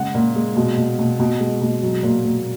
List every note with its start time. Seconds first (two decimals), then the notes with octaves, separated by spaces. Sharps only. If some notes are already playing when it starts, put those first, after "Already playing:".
Already playing: C#3 G#3 F#5
0.14 A#2
0.36 G#3
0.56 B2
0.77 B2
0.99 B2
1.19 B2
1.40 G#3
1.61 B2
1.82 F#3
2.03 A#2
2.25 A#2